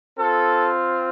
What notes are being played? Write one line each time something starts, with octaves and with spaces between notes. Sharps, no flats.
C4 F4 A4